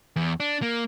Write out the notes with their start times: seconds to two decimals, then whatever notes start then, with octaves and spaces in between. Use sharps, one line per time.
0.16 E2
0.40 D4
0.62 A#3